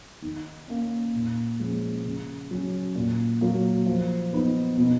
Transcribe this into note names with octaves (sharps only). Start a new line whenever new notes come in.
D#3
A#3 C#4
A#2
F3 G#3 C#4
C#3
F#3 C#4
A#2
F#3 A#3
F3
B3 D#4
B2